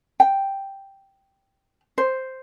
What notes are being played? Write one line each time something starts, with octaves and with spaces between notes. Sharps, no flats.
G5
C5